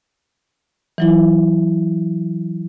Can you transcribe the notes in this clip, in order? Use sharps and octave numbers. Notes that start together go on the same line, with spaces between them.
E3 F#3 E4